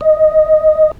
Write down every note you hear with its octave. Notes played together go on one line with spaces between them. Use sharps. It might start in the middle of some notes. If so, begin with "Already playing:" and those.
D#5